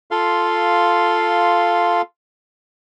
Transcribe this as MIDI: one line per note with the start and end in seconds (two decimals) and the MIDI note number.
0.11 2.02 65
0.11 2.02 69
0.11 2.02 77
0.11 2.02 84